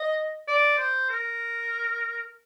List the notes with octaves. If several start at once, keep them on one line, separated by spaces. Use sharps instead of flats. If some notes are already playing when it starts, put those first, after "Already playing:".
Already playing: D#5
D5
C5
A#4